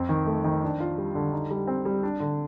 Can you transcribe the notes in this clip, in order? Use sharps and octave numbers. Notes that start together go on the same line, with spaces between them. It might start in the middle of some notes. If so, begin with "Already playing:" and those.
Already playing: F2 C4
D#3
A3
D#3
D4
F4
G3
D3
D#4
G3
C4
G3
D4
D3